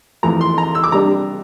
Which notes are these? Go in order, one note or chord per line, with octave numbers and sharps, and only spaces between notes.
F2 E3 A3 A#5
C6
A#5
E6
D6
C3 G3 D4 A#5